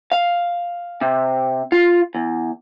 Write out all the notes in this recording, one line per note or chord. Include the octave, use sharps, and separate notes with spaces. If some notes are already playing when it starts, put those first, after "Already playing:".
F5
C3
F4
E2